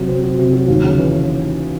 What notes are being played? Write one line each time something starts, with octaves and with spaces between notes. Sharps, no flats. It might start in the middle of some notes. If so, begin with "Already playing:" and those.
Already playing: C3 F#3
C4
F#4
C3
F#3
D#2
C#3
E3